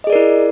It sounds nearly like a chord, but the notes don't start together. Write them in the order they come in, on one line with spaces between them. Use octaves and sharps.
D#5 G#4 D5 A#4 E4